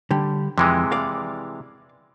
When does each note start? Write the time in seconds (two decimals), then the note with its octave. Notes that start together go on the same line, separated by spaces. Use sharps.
0.11 D3 G3
0.58 F2 C3 E3 G#3
0.92 D5 F5